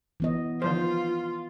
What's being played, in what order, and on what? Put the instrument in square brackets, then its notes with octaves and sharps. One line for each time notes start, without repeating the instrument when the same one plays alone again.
[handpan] E3 B3 D#5
[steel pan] D#3 F3 C5 [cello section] F4